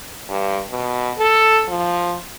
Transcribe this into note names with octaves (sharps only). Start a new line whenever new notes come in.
G2
B2
A4
F3